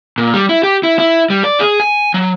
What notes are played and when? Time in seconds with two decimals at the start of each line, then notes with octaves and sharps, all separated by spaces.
0.18 A#2
0.34 G3
0.49 E4
0.63 G4
0.83 E4
0.99 E4
1.30 G3
1.44 D5
1.60 G#4
1.80 G#5
2.14 F#3